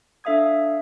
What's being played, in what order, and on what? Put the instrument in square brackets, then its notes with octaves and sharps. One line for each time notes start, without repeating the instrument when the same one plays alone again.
[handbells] D4 A4 E5 F5 D#6 G#6